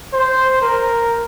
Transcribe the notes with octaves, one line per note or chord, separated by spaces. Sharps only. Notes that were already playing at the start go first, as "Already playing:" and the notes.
C5
A#4